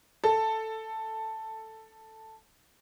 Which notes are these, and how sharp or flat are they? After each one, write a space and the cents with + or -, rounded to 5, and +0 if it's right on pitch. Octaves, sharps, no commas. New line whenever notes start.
A4 +5